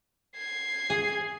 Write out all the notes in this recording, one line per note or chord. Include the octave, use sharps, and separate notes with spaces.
G#6 C7
G#4